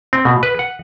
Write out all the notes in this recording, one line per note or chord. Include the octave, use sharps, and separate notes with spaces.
C4
B2
B4
F#5